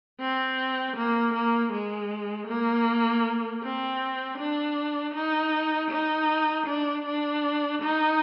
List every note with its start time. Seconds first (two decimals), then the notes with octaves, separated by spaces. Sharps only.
0.20 C4
0.96 A#3
1.34 A#3
1.72 G#3
2.47 A#3
3.63 C4
4.38 D4
5.14 D#4
5.90 D#4
6.67 D4
7.06 D4
7.82 D#4